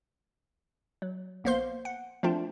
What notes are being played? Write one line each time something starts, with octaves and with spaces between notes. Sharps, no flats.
F#3
A#1 A#3 B3 C5 F5 C6
F#5
F3 A3 C4 D4 F4